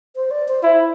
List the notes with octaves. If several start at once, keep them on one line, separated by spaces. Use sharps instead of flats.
C5
D5
C5
E4 C5